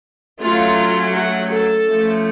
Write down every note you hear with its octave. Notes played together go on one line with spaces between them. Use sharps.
F#3 A3 C#4 F4
F#4
A4
F3 A3 C#4